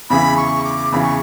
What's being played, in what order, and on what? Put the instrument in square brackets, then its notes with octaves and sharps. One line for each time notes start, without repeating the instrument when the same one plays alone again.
[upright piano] E2 C#3 E3 [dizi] B5
[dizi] C#6
D6
[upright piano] E2 C#3 E3 [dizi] B5
[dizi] C#6